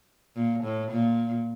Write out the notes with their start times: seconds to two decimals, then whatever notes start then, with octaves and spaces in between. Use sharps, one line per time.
0.36 A#2
0.64 A2
0.91 A#2